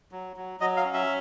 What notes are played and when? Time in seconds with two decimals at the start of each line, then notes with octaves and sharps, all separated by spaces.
0.11 F#3
0.36 F#3
0.60 F#3 D#5
0.77 F5
0.85 C#4
0.94 E5